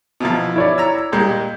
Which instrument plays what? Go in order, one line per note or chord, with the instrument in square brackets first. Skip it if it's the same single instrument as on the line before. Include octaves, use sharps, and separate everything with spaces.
[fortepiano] B2 E3 F3
[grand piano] E4 C#5 D5
[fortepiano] A#5 E6
[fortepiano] A#2 G3 G#3 [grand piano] G6